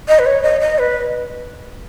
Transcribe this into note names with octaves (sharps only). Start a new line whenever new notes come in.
D#5
B4
C#5
D#5
D#5
B4